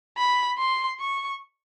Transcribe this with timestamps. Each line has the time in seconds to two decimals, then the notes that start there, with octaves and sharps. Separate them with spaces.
0.17 B5
0.58 C6
1.00 C#6